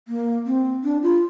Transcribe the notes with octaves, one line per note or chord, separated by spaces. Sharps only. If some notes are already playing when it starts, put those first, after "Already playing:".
A#3
C4
D4
F4